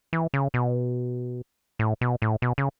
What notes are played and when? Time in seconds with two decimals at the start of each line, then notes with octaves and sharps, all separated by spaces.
0.13 E3
0.34 C#3
0.54 B2
1.79 A2
2.01 B2
2.22 A2
2.42 B2
2.58 C#3